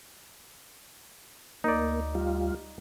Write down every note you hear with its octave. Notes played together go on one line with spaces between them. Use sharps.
D2 A#3 D#4 D5
G3 F4